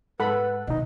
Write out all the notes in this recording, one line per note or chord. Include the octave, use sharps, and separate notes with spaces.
G#2 G#3 A4 B4 F#5 B5
B2 D#3 D#4 D#5